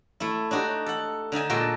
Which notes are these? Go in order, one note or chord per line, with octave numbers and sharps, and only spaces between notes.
A3 E4
D4 D#4 F#4 G4
A4 F#5
D3 D#4 E5 G#5
A#2 G#3 F#4 A4 G5 A5